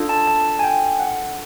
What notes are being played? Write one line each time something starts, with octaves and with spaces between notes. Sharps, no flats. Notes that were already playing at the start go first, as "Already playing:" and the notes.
Already playing: D4 F4 A4
A5
A5
G#5
G5
F#5